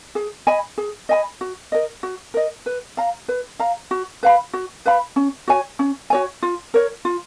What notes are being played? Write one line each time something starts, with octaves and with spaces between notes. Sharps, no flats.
G#4
D#5 G#5 B5
G#4
D#5 G#5 B5
F#4
A#4 D#5
F#4
A#4 D#5
B4
F5 A#5
B4
F5 A#5
F#4
B4 F5 B5
F#4
B4 F5 B5
C#4
F#4 C#5 G#5
C#4
F#4 C#5 G#5
F4
A#4 C#5
F4